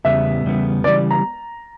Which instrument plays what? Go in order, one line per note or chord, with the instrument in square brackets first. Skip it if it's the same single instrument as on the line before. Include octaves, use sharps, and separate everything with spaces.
[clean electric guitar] E2 C#3 G3 B3 [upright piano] E5
[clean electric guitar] E2 C#3 G3 B3
[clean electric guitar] C#3 E3 G3 [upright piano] D5
[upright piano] A#5